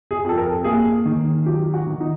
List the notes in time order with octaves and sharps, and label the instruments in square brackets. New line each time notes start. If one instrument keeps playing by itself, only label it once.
[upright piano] G#4
F2 A4
A#4
A#3 G#4
D#3
F#3 G4
F#4
D#3
D#4